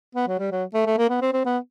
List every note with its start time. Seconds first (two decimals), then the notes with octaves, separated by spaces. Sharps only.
0.15 B3
0.28 F#3
0.39 G3
0.52 F#3
0.74 A3
0.86 A3
0.98 A#3
1.09 B3
1.22 C4
1.33 C4
1.46 B3